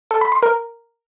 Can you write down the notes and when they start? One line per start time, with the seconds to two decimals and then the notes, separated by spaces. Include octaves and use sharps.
0.11 A4
0.21 B5
0.32 C6
0.43 A#4